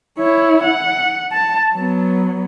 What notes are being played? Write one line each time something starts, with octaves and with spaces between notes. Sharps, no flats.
E4 C#5
F#5
A5
F#3 B3